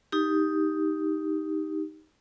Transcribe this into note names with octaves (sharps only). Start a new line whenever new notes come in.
D#4 G4